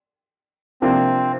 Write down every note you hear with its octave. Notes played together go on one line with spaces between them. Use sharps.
C3 F3 A#3 C4 D4 F4